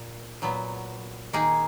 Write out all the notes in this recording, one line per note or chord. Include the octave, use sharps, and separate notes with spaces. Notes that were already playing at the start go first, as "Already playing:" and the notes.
Already playing: A#2
A#2 F#3 B3
D#3 A#3 D#4 G#4